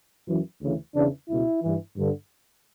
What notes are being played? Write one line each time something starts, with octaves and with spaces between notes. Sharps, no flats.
F#2 E3
D2 C#3 E3
E2 C#3 E3 D4
C#2 B2 E4
G2 E3
G2 D3